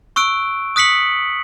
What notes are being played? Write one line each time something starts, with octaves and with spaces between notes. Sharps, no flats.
C#6 E6 F#6 D7
D#6 F#6 B6 C#7 F#7